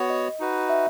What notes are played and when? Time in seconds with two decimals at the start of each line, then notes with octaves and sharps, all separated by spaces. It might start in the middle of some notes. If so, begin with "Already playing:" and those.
Already playing: B3 F#4 C#5
0.10 D#5
0.40 D#4 F#4 B4
0.69 E5